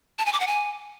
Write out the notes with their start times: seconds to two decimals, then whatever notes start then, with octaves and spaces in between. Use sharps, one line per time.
0.19 A5
0.26 G#5
0.33 D6
0.40 F#5
0.47 G#5